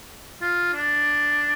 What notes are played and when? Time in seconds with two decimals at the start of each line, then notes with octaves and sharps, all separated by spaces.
0.41 F4
0.74 D4